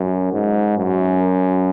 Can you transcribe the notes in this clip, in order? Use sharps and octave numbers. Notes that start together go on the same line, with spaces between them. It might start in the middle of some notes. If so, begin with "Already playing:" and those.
Already playing: F#2
G#2
F#2